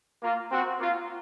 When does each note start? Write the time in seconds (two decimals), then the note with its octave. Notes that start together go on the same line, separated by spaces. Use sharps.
0.23 A#3 F4
0.51 C4 F#4
0.80 A#3 F4